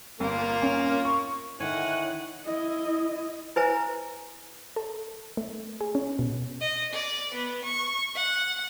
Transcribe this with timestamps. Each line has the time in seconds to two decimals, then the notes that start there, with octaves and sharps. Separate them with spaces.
0.20 G1 A#3 F4
0.62 C#4
1.05 C#6
1.60 D3 D#3 E4 C#5 F#5 G#5
2.45 E4 D#5
3.56 E4 B4 C5 E5 G#5 A#5
4.76 A4
5.37 A3
5.81 G#4
5.95 C#4
6.19 B2
6.61 D#5
6.93 D5
7.34 B3
7.65 C#6
8.15 F#5